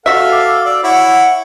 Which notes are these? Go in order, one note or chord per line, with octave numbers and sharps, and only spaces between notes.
F#4 A4 E5 F5
D6
D5 E6
E4 C#5 F#5